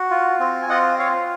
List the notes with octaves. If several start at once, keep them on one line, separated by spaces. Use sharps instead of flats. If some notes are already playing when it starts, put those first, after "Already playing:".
Already playing: F#4
F4
C4
G#5
F4 D#5 F#5
F4 C#5 F5